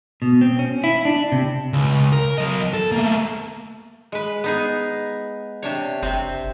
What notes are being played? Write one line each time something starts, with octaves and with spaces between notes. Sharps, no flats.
B2
C4
C#4
E4
D4
C3
C#2
A#4
F#3 D#5
A4
A3 A#3
G#3 B4
B3 D#4 G#4
C3 D4 C#5
F#1 C3 C4